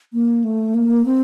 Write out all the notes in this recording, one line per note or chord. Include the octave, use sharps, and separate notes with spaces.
A#3
A3
A#3
C4